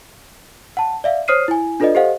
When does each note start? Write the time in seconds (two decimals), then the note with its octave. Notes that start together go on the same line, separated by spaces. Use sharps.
0.77 F#5 A5
1.04 D5 E5 F5
1.28 C5 C#5 D#6 F6 C7 D#7
1.48 E4 G#5
1.80 D4 F4 A4 B4 D5 D#5
1.95 G4 A4 C5 D#5 F5 F#5